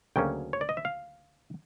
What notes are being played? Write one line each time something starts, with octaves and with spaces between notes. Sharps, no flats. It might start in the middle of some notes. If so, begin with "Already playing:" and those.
D2 C#3 F#3 A#3 C#4 G5
C#5
D5
D#5
E5
F5